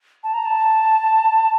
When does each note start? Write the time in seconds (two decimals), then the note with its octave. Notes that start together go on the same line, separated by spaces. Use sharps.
0.24 A5
0.34 A#5
0.45 A5